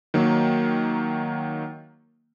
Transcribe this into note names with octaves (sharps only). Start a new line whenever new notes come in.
D#3 F#3 A#3